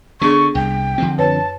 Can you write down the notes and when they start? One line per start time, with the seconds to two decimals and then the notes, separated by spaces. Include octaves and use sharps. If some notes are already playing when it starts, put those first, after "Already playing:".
0.21 D3 B3 D4 G#4 C#6
0.55 C2 G5
0.98 D3 F3 C4
1.18 F#2 B4 C#5 A5